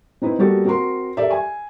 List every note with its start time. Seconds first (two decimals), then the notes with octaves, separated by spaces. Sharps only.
0.22 C4 D#4 E4 B4
0.38 G3 A#3 B3 F#4 G4 A4
0.65 C4 F#4 A#4 C6
1.17 G4 A4 A#4 D5 E5
1.30 G#5